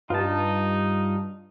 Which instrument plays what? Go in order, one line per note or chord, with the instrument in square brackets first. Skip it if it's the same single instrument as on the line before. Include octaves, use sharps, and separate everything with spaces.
[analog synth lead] G2 [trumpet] D#4 [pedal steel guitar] F4 A5